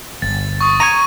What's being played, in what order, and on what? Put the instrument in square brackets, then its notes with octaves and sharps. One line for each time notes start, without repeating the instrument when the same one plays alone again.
[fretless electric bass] G1 [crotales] A6
[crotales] C#6 D#6
[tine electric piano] A#5 C#6 G#6 [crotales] D#7